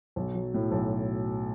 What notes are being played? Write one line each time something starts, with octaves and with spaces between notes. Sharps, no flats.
B1
F#3
A2
B1